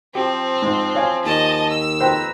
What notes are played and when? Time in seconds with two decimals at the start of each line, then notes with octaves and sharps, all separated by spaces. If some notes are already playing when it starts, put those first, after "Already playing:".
0.15 F3 C4 G4
0.62 G#2
0.95 C#5 F5 G#5
1.25 D#2 D#5 A5
1.70 E6
2.00 F2 B4 C5 G5 A#5